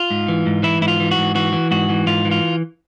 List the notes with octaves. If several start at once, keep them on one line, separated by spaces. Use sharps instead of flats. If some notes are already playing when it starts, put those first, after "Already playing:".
Already playing: F4
G#2
E3
G#2
E3 E4
G#2 E4
F4
E3
F#4
G#2
E3 F#4
E3
G#2 F#4
E3
G#2 F4
E3
F4